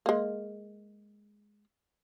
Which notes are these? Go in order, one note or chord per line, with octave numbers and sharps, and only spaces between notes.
G#3 A#3